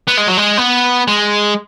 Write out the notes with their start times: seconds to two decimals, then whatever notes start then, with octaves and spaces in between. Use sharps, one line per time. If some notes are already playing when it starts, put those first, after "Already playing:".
0.08 B3
0.18 G#3
0.28 F#3
0.38 G#3
0.58 B3
1.08 G#3